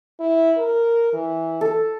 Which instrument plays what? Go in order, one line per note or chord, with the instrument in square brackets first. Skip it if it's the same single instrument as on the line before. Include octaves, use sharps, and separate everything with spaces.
[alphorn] E4
A#4
E3
[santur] A4